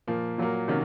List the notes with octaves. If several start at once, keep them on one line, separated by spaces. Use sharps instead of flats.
A#2 F3 A#3
A#2 F#3 A#3
C3 D#3 F#3 A#3 C#4